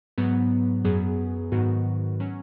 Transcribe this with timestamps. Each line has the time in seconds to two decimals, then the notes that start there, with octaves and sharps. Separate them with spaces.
0.18 G#2 F#3 B3
0.85 F#2 F#3 B3 G#4
1.52 G#2 D#3 F#3 B3 F#4
2.20 F#3 C#4